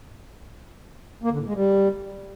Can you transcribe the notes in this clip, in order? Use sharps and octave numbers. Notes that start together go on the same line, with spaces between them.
A#3
D3
A2
G#3
G3